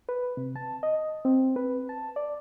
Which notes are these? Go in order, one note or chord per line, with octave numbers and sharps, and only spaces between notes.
B4
C3
A5
D#5
C4
B4
A5
D5